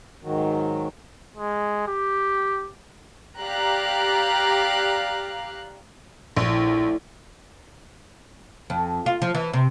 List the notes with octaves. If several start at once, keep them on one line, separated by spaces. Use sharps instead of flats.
G#2 D#3 F#3
G#3
G4
G4 D5 F5 A#5 F#6
A#1 A2 D5
F2
F4
F3
E3
C3